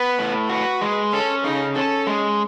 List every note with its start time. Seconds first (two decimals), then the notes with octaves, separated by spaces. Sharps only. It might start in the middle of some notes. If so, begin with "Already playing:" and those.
Already playing: B3 B4
0.19 A2
0.49 F#4 B4
0.81 G#3
1.13 C#4 A4
1.44 C#3 D#4
1.75 C#4 A4
2.07 G#3